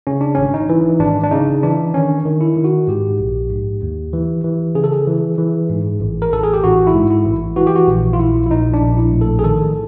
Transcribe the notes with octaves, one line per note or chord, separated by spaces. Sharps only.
C#3 C#4
D4
G#1 C#4
D#4
E3
G#1 D4
D4
C#3 D#4
E3 D4
D#3 C#4
D#3
E4
D#3
F#4
G#2 G4
A#1
G#2
D#2
E3
E3
C#3 G#4
A4
G#4
E3
E3
G#2
A1
A#4
A1 A4
G#4
G4
A1 F#4
E4
G#2
E4
A1
E3 F#4
G4
F#4
A#1
F4
A#1 E4
E4
A#1 D#4
D4
A#1
E4
A2
A4
G#4
D#3 A4